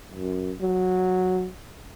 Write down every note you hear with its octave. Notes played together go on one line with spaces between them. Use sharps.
F#2
F#3